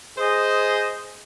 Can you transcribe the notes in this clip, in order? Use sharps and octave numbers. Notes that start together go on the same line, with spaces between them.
G#4 C5 D#5